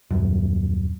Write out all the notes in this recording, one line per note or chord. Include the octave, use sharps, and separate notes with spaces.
D#1 F#2